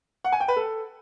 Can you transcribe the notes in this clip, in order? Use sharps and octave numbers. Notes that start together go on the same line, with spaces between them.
F#5
G#5
G5
B4
A4